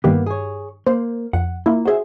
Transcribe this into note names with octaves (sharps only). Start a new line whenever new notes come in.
G2 D#3 A#3 B3 G4
G#4 C#5
A#3 C5
F2 F#5
A#3 E4 F4
F#4 G#4 C5 D#5 E5